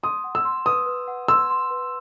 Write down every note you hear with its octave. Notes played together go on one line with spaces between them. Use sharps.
C6 D#6
F#5
E6
C6
B4 D#6
B4
F#5
C6 E6
C6
B4